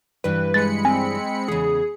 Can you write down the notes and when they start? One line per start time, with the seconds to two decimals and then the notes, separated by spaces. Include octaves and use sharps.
0.24 G2 E3 G3 B4
0.54 G#3 B5 A6 C#7
0.85 C4 G#5
1.48 E2 C#3 G#4